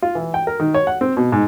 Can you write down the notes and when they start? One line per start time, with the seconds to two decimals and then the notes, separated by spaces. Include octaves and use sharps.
0.02 F4
0.15 E3
0.34 G5
0.47 A#4
0.60 D#3
0.74 C#5
0.87 F#5
1.01 C4
1.17 B2
1.32 G#2